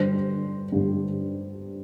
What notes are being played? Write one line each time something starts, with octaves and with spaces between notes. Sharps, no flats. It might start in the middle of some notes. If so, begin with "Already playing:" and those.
Already playing: G2 D3 G3 C5
G2 D3 G3